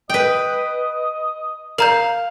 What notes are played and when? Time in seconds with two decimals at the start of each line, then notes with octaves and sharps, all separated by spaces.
0.10 B4 D#5 G5
1.78 A#4 F5 A#5 G6